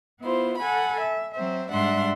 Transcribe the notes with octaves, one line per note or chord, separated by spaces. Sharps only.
B3 E4 F4 C5
A4 F#5 G#5 B5
E5
F#3 C4 C5 E5
G#2 G3 D4 E5 F#5 C6